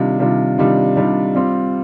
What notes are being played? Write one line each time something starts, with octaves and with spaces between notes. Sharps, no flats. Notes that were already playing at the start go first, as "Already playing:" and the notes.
Already playing: C3 D#3 G3 D4 F4
C3 D#3 G3 D4 F4
C3 D#3 G3 D4 F4
C3 D#3 G3 D4 F4
G3 C4 F4